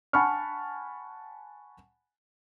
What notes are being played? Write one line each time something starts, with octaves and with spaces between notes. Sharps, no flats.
F#5 G#5 A5 B5 C#6 F6